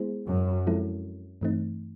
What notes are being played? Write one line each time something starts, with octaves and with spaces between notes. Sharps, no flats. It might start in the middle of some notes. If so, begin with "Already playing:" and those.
Already playing: G#3 B3 E4 G#4 C5
F#2
F3 G#3 C4 E4 A4
G2 E3 A3 C4 D#4